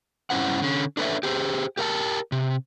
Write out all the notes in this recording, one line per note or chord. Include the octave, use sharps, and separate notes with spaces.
G2 C#4 E4 C5 F#5
D3 C#4
D4 A4 B4 C#5 E5
G4 G#4 C5
G4 A#4 F5 A5
C3